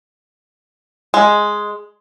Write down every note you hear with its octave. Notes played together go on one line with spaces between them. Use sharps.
G#3